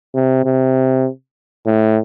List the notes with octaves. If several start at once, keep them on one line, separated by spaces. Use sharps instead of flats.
C3
C3
A2